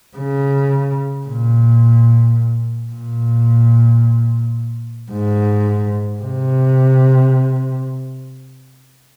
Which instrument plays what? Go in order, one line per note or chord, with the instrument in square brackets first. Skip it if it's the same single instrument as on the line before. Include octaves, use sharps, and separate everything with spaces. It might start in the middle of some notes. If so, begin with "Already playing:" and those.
[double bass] C#3
A#2
A#2
G#2
C3